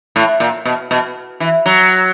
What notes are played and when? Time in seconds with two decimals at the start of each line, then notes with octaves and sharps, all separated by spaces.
0.16 A2
0.40 A#2
0.65 B2
0.91 B2
1.40 E3
1.66 F#3